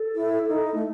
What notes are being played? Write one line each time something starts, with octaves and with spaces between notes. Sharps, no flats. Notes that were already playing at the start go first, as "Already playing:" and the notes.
Already playing: A4
E4
D#4
A3